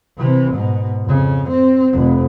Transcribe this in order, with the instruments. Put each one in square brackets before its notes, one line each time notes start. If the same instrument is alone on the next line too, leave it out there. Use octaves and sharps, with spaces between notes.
[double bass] C3 E3
G#2 B2
F2 C#3
C4
F1 F2